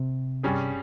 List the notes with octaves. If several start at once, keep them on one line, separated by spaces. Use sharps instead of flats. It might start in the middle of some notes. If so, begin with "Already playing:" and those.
Already playing: C3
G2 G3 C#4 G#4